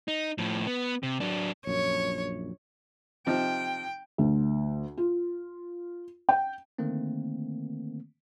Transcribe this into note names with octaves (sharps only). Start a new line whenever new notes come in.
D#4
A2 F3
B3
C3
F#3 D4
A#1 F#2 C#5
C3 F3 D#4 G5
D2
F4
G5
D3 D#3 A3 A#3 C4